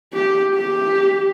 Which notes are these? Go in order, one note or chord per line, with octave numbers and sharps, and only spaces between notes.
G4
G4